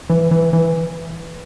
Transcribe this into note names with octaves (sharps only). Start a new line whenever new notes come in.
E3
E3
E3